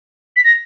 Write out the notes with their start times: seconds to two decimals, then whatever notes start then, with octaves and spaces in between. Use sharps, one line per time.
0.36 B6
0.44 A#6